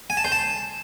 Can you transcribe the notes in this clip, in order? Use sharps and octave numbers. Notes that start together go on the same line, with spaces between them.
G#5
A5
C5
A5